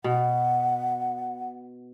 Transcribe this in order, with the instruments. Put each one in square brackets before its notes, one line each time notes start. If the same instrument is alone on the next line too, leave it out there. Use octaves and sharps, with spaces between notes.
[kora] B2 [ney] F#5